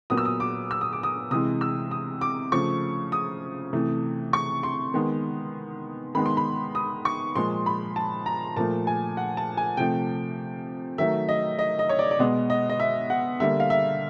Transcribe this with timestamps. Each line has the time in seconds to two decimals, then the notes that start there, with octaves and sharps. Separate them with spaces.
0.10 A#2 F#3 B3 D#6
0.17 E6
0.25 D#6
0.40 D6
0.71 E6
0.81 D#6
0.93 D6
1.03 D#6
1.31 C3 E3 G#3 D#6
1.61 E6
1.91 D#6
2.21 D6
2.52 C#3 F3 A3 C#6
3.12 D#6
3.73 C3 E3 A3
4.33 C#6
4.63 C6
4.94 D#3 G#3 B3
6.15 D#3 G#3 B3 B5
6.26 C6
6.37 B5
6.75 D#6
7.05 C#6
7.36 A#2 F3 G#3 C6
7.66 B5
7.96 A5
8.26 A#5
8.56 A#2 F3 A3 A5
8.87 G#5
9.17 F#5
9.37 A5
9.57 G#5
9.77 C3 F3 A3 G5
10.98 D#3 F#3 A3 E5
11.29 D#5
11.59 D#5
11.79 D#5
11.89 C#5
11.99 D5
12.11 D5
12.19 B2 G#3 B3 D#5
12.50 D#5
12.69 D#5
12.80 E5
13.10 F#5
13.40 D3 G3 A#3 E5
13.60 F5
13.70 E5